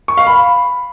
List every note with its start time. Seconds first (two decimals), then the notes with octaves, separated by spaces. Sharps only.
0.08 C#6
0.18 F5
0.27 B5